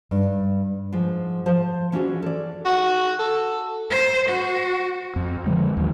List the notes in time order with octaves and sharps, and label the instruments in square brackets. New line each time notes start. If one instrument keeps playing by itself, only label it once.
[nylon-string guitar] G2
G#2 F3
F3 C5 F5 A5
E3 C#4 D4 F4 F#4 G#4
A4 D5
[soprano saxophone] F#4
A4
[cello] C5
F#4
[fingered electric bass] F2
D3 F3 G#3
D#2 F#3